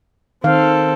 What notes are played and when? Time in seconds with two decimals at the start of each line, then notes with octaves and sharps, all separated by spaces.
0.44 D#3 C4 A4 F5